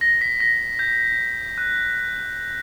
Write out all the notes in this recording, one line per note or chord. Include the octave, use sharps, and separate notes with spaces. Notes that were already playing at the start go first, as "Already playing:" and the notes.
A#6
B6
A#6
G6
F#6